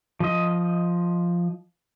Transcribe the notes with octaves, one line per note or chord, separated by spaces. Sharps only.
F3 D#5